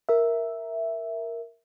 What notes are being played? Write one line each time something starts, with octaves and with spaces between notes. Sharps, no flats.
A#4 E5